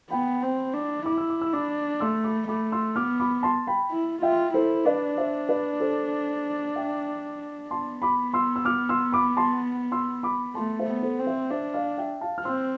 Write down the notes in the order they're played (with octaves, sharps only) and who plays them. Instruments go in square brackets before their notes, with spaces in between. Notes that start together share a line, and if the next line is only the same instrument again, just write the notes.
[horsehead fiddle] B3 [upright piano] G5 B5
[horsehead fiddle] C4
D4
[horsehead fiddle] E4 [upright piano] D6
[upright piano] E6
D6
E6
[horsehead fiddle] D4 [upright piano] B5 D6
[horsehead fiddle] A3 [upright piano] C6 E6
[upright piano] B5 D6
[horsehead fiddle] A3 [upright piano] B5 D6
[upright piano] C6 E6
[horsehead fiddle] B3 [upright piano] D6 F6
[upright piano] B5 D6
A5 C6
G5 B5
[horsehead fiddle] E4
[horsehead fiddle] F4 [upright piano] E5 G5
[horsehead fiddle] E4 [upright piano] A4 C5
[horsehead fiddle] D4 [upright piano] B4 D5
[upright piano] C5 E5
B4 D5
A4 C5
E5 G5
[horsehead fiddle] B3 [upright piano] A5 C6
[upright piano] B5 D6
C6 E6
E6
D6 F6
C6 E6
B5 D6
A5 C6
C6 E6
B5 D6
[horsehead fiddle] A3 [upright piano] A5 C6
[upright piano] C5 E5
[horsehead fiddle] B3
[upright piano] A4 C5
[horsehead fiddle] C4
[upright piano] C5 E5
[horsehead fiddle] D4 [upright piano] C5 E5
[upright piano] D5 F5
E5 G5
F5 A5
F6
[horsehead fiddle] C4 [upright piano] C6 E6